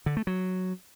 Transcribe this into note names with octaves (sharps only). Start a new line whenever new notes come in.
D3
A3
F#3